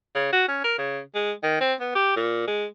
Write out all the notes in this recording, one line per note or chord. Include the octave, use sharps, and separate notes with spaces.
C#3
F#4
C#4
A#4
C#3
G#3
D#3
C4
B3
G4
A#2
G#3